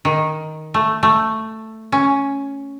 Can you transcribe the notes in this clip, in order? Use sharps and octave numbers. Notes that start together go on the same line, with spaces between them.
D#3
A3
A3
C#4